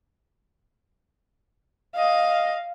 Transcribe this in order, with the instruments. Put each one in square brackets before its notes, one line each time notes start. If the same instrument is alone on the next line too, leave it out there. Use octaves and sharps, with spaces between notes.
[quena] D#5 [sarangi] F5